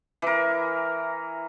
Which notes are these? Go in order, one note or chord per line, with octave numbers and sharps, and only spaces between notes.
E3 A#4